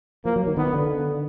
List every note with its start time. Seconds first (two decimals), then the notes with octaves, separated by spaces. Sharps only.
0.25 F3 A#3
0.36 F#3
0.47 D#3
0.57 D#3 B3
0.73 D3